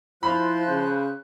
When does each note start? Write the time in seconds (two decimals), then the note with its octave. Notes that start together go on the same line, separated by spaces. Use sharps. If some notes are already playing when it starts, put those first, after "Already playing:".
0.23 F3 E4 F4 C5 B5 F#6
0.67 C#3